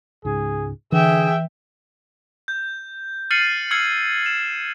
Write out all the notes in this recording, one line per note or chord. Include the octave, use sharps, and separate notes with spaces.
C#2 G#2 G#4
D3 E3 G#4 E5 G5
G6
F6 A6 C7 C#7 D#7 F#7
E6 F6 G#6 C7 C#7 F#7
E7